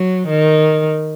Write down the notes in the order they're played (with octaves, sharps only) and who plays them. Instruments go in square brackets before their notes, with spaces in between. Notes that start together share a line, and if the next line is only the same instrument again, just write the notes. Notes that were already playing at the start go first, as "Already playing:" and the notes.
Already playing: [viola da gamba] F#3
D#3